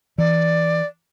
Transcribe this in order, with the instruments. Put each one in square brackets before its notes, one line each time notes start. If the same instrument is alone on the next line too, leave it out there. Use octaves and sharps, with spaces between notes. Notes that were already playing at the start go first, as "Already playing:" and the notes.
[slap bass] E3 [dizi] D5